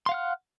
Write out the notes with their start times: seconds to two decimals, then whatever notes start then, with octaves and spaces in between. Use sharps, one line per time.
0.06 C6
0.09 F5
0.12 F#5
0.14 F6